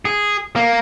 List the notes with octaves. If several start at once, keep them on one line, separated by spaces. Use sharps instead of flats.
G#4
A#3